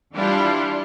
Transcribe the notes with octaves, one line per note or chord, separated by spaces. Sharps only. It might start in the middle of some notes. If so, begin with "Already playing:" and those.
E3 G3 D4 E4 F4